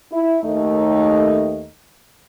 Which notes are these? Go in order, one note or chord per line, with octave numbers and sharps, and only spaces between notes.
E4
D#2 A3 D#4